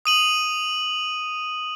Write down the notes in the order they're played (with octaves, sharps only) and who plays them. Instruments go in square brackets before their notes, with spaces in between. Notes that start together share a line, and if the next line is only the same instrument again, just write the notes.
[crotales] D#6 D#7 F#7